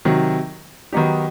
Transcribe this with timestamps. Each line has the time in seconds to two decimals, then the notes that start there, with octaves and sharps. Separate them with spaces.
0.05 C3 D#3 F#3
0.93 D#3 F#3 B3 D#4 G4